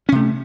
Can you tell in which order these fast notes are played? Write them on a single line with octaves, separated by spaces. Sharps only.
C#4 C3 A3